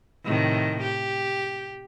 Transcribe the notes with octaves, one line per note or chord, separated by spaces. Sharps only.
A2 C3 D#3
G4